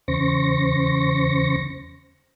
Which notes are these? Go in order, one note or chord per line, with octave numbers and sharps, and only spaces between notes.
E2 C#3 C5 C#6 A#6